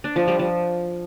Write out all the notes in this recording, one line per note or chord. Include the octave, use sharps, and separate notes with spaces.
D4
F3
G3
F3